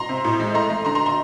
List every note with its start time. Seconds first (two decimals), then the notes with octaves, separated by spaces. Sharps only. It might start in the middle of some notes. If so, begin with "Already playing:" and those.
Already playing: A#5 C6
0.09 C3
0.24 A2
0.40 G#3
0.54 A3 A#5 C6
0.70 A3
0.85 D3 A#5 C6
0.95 A#5 C6
1.06 A#5 C6